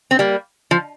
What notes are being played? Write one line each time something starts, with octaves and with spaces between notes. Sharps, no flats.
C4
G3 A#3
F3